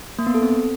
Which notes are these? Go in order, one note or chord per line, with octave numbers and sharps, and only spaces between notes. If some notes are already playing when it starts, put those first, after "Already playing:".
A#3
B3
A4
C4